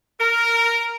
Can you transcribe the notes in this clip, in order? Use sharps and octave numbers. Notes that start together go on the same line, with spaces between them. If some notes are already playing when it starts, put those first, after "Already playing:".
A#4